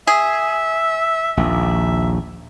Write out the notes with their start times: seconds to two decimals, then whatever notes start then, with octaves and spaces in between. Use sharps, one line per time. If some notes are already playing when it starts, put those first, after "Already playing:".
0.07 G#4 E5
1.37 A#1 D#2 E5